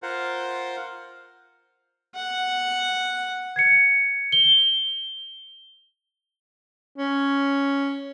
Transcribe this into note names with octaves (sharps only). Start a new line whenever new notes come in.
F4 A#4 C5 F#5
F#5
G#6 C7 C#7
G7
C#4